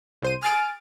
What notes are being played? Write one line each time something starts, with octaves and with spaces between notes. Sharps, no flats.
C2 C5 D#7
G#5 F6 A6 D7